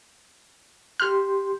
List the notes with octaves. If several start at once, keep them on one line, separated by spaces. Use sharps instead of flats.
G4 C6 F6 G6